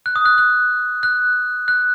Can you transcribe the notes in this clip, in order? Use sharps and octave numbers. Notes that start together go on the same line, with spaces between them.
F#6
D#6
F#6
F#6
F#6
F#6